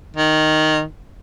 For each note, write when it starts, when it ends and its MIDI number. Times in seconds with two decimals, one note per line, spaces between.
0.17 0.84 51